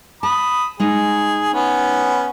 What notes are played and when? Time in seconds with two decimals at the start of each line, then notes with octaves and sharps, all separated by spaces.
0.23 A5 B5 D#6
0.80 G#3 D#4 G#4
1.54 B3 C#4